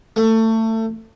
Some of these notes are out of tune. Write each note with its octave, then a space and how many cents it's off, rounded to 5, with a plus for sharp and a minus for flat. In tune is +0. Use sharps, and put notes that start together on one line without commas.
A3 +25